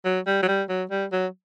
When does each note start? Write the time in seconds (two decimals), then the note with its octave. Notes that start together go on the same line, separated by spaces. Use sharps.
0.05 F#3
0.27 G3
0.43 F#3
0.48 G3
0.69 F#3
0.91 G3
1.12 F#3